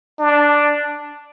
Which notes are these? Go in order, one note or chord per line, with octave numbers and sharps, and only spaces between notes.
D4